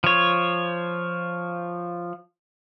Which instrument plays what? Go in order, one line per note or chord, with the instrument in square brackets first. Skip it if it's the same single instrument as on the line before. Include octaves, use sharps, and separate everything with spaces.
[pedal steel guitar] F3 C#5